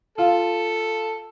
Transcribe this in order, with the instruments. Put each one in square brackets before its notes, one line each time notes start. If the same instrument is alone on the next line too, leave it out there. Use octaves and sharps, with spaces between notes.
[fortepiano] F4 [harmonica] A4